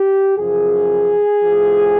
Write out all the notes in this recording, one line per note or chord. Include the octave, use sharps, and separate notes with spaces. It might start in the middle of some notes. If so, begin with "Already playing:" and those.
Already playing: G4
F#2 C#3 F3 G#4
A2 F3